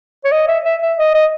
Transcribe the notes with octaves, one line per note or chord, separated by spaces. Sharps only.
C#5
D#5
E5
E5
E5
D#5
D#5